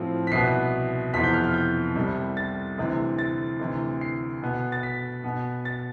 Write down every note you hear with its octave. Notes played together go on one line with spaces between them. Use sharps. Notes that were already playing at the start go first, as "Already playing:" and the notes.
Already playing: A2 F3 C4
B6
C2 B2 B3 C7
F2 C3 E3 B3 B6
G6
F6
F6
G6
C2 C3 G3
A6
D2 C3 E3
A6
D2 C3 E3
C7
B2 B3
A6
B6
B2 B3
A6